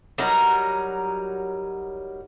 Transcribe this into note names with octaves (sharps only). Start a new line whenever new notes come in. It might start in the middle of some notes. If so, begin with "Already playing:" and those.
F#3 G3 D#4 A#4